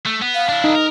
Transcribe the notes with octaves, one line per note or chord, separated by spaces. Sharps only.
A3
B3
F5
D4 E4
D#4
A#4